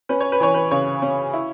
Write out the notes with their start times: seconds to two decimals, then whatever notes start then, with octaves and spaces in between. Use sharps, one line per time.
0.09 C#4 B4
0.20 C#5
0.32 B4
0.40 E3 C#5
0.54 B4
0.71 C#3 C#5
1.02 C#4
1.34 E4